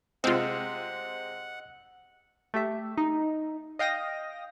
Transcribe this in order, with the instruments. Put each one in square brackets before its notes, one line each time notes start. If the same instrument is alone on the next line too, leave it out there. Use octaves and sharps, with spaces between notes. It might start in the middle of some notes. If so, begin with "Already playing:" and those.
[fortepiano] C3 G#3 [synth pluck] C4 F4 [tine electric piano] D#5 E6 F6 [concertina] F#5
[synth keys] A3 G4 E5
D#4
D#5 F5 G5 D#6 A#6